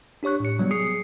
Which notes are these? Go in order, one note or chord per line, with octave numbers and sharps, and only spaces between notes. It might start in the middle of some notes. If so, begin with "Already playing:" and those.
D4 G4 C#5 C#6 F#6
A2 C#7
C3 F#3 G3 B3
G#4 D#6 C7 C#7